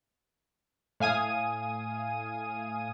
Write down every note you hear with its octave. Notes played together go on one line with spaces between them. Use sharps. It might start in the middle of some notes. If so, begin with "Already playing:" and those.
A2 F5 G#5 D#6 D#7